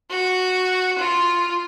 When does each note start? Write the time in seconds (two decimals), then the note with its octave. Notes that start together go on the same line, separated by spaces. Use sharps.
0.11 F#4
0.98 F4